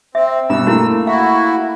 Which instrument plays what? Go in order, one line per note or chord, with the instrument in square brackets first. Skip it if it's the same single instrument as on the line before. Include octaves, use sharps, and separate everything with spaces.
[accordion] C4 [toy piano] E5
[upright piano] G2 B2 [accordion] E6
[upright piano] A3 A#3 [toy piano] E4 F#4
[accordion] E4 F#4 [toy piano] F5